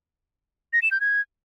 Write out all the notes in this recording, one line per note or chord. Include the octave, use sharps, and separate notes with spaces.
A#6
E7
G6
G#6